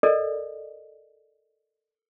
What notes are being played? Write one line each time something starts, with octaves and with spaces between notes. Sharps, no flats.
A4 A#4 D5 D#5